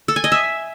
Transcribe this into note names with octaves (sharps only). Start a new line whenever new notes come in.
A4
G#5
D#5
E5